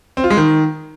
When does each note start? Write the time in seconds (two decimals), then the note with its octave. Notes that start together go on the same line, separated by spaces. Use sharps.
0.17 C4
0.24 F4
0.30 G#3
0.37 D#3